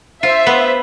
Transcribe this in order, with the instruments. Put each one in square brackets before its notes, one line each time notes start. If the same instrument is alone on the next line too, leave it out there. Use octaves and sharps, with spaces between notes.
[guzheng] F4 [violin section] C5 E5
[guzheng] B3